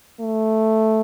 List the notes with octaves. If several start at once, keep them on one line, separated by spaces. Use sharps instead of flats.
A3